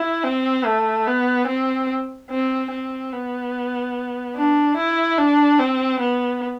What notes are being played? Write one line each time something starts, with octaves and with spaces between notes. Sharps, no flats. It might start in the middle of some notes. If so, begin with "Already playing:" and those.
Already playing: E4
C4
A3
B3
C4
C4
C4
B3
D4
E4
D4
C4
B3